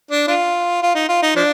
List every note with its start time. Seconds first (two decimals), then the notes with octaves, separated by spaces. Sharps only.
0.11 D4
0.28 D4 F4
0.82 F4
0.95 D#4
1.09 F4
1.22 D#4
1.36 F3 D4